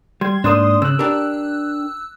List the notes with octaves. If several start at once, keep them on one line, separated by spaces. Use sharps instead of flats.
G3 C6 G#6
G#2 A#3 D4 C6 D#6
C#3 E6 F#6
D4 G4 A#4